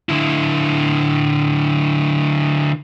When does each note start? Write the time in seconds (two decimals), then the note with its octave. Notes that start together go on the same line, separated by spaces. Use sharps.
0.09 D3 E4